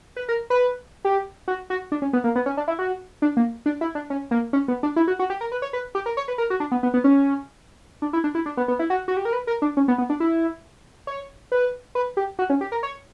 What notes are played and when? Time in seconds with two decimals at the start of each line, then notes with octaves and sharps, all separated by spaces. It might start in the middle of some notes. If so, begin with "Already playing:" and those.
0.16 B4
0.29 A#4
0.50 B4
1.05 G4
1.48 F#4
1.70 F#4
1.92 D4
2.02 C#4
2.13 B3
2.24 A#3
2.36 B3
2.46 C#4
2.57 D4
2.68 E4
2.79 F#4
3.22 D4
3.37 A#3
3.66 D4
3.81 E4
3.95 D4
4.10 C#4
4.31 A#3
4.53 C#4
4.68 B3
4.83 D4
4.96 E4
5.08 F#4
5.19 F#4
5.30 G4
5.41 A#4
5.52 B4
5.62 C#5
5.73 B4
5.95 G4
6.06 A#4
6.17 C#5
6.28 B4
6.38 A#4
6.50 F#4
6.60 D4
6.72 B3
6.83 B3
6.94 B3
7.04 C#4
8.02 D4
8.13 E4
8.24 D4
8.35 E4
8.46 D4
8.57 B3
8.68 B3
8.79 E4
8.90 F#4
9.08 F#4
9.17 G4
9.25 A#4
9.33 B4
9.47 A#4
9.62 D4
9.77 C#4
9.88 B3
9.98 B3
10.10 D4
10.20 E4
11.07 C#5
11.52 B4
11.95 B4
12.17 G4
12.39 F#4
12.50 C#4
12.61 G4
12.72 A#4
12.83 C#5